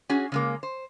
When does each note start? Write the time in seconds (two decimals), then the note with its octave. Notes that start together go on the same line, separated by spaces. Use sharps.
0.09 C#4 F#4 G#4
0.32 C#3 G#3 A#3
0.63 C5